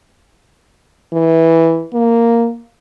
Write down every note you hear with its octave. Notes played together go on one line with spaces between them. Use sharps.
E3
A#3